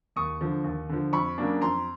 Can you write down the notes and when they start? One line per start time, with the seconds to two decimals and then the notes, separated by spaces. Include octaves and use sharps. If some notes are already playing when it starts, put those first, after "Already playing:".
0.16 D#2 C#6 D#6
0.41 D3 F3
0.64 D#2
0.89 D3 F3
1.13 F2 B5 C#6
1.38 C#3 F#3 A#3 D4
1.61 F2 A#5 C6